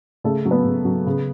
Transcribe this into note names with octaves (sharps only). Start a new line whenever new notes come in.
C#3 A3 A4
F#3
B3 B4
C#3
F#3
C#3